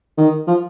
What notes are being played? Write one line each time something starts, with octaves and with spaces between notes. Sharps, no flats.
D#3
F3